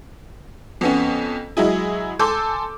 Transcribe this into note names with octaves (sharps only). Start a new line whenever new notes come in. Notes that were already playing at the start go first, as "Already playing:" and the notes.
F2 B3 C#4
F#3 G#3 E4 G#4
A4 G#5 C6 D6 E6 G6